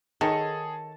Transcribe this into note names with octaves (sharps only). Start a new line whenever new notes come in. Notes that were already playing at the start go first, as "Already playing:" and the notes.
D#3 G#4 A4 C#5 D#5 A5